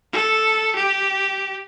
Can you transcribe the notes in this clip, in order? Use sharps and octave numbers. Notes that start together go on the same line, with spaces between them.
A4
G4